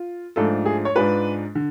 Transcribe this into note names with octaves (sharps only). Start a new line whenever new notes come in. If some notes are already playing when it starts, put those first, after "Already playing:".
Already playing: F4
G#2 F3 A3 D4 F4 A4
G#4
C#5
G#2 G#3 D4 F4 B4
D3